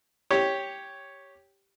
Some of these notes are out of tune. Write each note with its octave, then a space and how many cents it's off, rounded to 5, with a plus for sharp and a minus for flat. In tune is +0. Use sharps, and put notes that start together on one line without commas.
G4 +0 C#5 +0